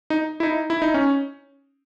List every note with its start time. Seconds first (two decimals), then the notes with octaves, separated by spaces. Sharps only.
0.10 D#4
0.40 E4
0.43 D#4
0.70 E4
0.82 D#4
0.94 C#4